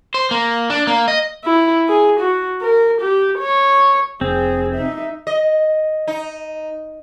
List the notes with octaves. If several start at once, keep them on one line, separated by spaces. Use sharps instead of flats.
C5
A#3
D4
A#3
D#5
E4
G#4
F#4
A#4
G4
C#5
F1 C4 G#4
D#4 E5
D#5
D#4